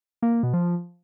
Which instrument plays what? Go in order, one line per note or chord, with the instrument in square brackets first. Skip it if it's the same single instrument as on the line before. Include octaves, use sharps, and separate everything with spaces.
[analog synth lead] A#3
A#3
B2
F3